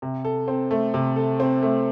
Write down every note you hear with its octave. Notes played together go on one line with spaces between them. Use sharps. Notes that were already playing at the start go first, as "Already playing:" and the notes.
C3
A4
C4
A3
C3
A4
C4
A3